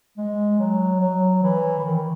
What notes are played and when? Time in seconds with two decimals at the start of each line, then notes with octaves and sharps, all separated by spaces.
0.18 G#3
0.59 F#3
1.01 F#3
1.43 E3
1.79 E3
1.84 D#3